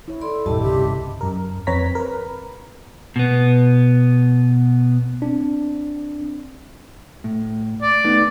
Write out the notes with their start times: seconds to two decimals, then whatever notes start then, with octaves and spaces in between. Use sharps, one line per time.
0.08 E4 C#5
0.21 A4 D5 B5 C6
0.46 D#1 G2 E4 G4 D#5 A5
0.62 G1 C2 C#3 G4 E5
1.21 F#2 A#4
1.67 F2 C4 B4 C#5 A#5 B6
1.95 A#4 B4
3.16 B2 B3
5.22 C4 D4
7.24 A2
7.82 D5
8.04 A3 B3 D#4